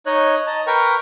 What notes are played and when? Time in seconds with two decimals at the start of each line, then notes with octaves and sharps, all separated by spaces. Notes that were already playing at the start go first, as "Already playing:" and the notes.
0.06 D#4 C#5 D#5 F#6
0.47 D#5 A5 A#5
0.67 A#4 B4 G5 A#5 C#6